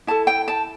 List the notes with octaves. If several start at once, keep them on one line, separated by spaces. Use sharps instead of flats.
E4 A4 A5
G5
A5